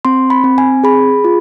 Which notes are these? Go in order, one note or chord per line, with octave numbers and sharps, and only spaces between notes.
C4 C6
B5
C4
G#5
G#4 B5
F4